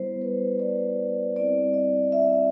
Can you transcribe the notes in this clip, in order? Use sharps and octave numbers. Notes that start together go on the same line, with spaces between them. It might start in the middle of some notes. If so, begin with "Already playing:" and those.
Already playing: G3 B3 E4 C5
B4
D5
G3 C4 E4 D5
D#5
E5